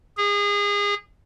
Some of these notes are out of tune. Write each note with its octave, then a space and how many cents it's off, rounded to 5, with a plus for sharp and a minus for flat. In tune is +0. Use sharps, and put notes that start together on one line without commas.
G#4 -30